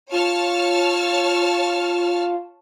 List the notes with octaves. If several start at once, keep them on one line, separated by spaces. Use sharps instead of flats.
F4 C#5 A5 F6